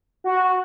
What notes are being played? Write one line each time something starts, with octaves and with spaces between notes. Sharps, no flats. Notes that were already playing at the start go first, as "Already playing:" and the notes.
F#4